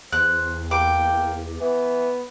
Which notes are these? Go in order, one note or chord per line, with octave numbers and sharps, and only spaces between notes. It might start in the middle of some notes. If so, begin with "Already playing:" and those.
E2 C5 F#6
A#3 G5 D6
E3 B3